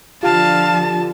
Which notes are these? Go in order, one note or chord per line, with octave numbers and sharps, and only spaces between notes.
D3 F3 F4 G4 F5 A5